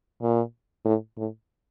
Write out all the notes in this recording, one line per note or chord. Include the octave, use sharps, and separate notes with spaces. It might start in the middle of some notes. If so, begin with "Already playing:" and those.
A#2
A2
A2